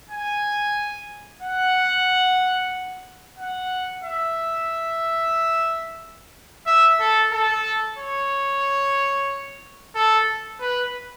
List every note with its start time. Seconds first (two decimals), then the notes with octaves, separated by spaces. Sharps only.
0.10 G#5
1.42 F#5
3.38 F#5
4.04 E5
6.66 E5
7.00 A4
7.32 A4
7.98 C#5
9.95 A4
10.60 B4